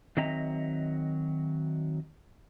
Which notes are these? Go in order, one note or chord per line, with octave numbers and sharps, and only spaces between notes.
D#3 F#3 C4 D#5 E5 A#5